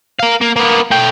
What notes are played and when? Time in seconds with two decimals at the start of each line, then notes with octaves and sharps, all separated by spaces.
0.20 A#4 F5
0.41 A#3
0.56 A#3 B3
0.91 A3 G5